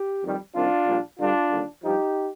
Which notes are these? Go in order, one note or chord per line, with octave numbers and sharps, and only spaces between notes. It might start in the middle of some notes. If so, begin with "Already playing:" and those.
Already playing: G4
F2 D#3 G3
C2 C3 D#3 D4 F4
A#1 A#2 G3
G2 D3 G3 D4 F4
D#2 D3 G3
G2 F3 D#4 G4